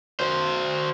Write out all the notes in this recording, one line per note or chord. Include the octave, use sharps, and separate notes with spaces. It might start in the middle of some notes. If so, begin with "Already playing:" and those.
F#4 C5